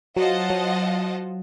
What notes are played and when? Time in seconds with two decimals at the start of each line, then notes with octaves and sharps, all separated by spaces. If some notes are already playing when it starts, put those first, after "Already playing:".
0.16 F#3 F4 C5 D#5 F#5 A5
0.50 F#3